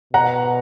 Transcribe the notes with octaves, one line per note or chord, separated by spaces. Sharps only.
B2 F#5 A#5